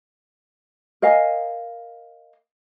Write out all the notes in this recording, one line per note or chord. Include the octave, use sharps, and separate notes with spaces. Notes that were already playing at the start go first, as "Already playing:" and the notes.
A#4 D#5 F5 G#5